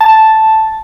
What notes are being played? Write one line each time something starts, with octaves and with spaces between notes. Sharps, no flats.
A5